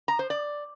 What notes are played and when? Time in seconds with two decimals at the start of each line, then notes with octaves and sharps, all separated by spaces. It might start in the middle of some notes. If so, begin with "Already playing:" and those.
0.08 A#5
0.19 C5
0.30 D5